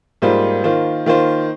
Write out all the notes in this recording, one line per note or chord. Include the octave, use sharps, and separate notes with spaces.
G#2 G3 A#3 F4 C5
D#3 A#3 F4 C5
D#3 A#3 F4 C5